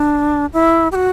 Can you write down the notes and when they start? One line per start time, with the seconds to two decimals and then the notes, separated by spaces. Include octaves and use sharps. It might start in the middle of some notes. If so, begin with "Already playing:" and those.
Already playing: D4
0.53 E4
0.92 G4
0.95 F#4